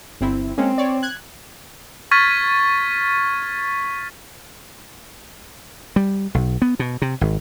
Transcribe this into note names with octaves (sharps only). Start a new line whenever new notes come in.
G1 C4 E4
G#3 A#3 C4 C#4
C#5 D5
F#6 G#6
C#6 F6 G#6 A6 B6 D#7
G3
B1
B3
B2
C3
G#1